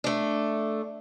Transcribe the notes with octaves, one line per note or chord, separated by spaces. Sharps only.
A3 D4